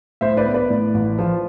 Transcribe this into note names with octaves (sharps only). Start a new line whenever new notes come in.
A2 C5 E5
B4 D5
B3
B4 D5
A2
A1
F3